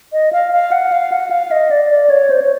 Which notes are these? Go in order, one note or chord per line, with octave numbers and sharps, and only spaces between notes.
D#5
F5
F5
F#5
F5
F#5
F5
D#5
D5
D5
C#5
C5
C#5